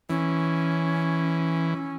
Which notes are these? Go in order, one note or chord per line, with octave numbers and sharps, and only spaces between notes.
E3 C#4